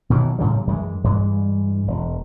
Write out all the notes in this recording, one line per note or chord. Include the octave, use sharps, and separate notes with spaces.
B2 D#3 E3 F#3
A2 C#3 F#3 G3
F#2 E3 G#3
G2 E3 G#3
E1